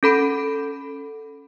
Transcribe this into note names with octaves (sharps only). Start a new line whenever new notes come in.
C#4 A4 B5 D7